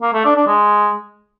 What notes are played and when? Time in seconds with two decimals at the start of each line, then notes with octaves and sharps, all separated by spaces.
0.02 A#3
0.14 A3
0.25 D4
0.36 D4
0.47 G#3